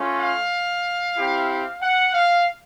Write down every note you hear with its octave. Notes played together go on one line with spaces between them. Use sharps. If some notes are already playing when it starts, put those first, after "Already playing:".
Already playing: A3 C#4 F4
F5
C4 E4 G4
F#5
F5